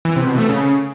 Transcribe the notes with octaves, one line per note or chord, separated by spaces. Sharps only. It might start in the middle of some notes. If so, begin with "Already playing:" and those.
E3
C3
B2
A3
C#3